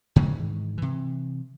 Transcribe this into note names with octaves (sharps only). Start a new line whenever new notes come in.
G#2 D#3 E3 G#3
C3 E3